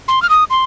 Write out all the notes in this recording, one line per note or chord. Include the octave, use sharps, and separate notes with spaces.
C6
F6
D#6
C6